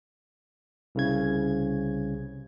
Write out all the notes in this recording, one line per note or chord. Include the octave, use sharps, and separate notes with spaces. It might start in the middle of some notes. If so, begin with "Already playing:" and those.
C2 C#3 G#6